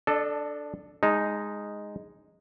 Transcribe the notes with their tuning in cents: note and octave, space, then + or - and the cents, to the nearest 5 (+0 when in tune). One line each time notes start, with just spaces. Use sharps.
D4 +0 A4 +0 D#5 -40
G#3 -5 D#4 +0 A5 +35